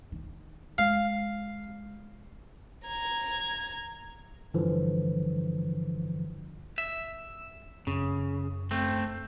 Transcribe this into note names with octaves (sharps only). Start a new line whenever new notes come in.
D#3
G#3 F5
A#5 G#6
G2 D3 E3 F3
E5
F#2 C#3
A3 C4